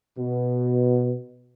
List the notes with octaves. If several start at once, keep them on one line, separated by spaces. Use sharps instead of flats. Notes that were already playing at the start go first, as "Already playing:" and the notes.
B2